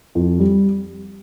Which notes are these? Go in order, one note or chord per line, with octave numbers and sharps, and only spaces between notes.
F2
G3